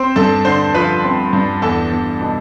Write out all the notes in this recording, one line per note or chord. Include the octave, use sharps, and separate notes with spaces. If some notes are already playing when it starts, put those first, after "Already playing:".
Already playing: C4 C5
G2 A4 A5
D3 C5 C6
F3 B4 B5
C4
G2
E2 A4 A5
E2
B2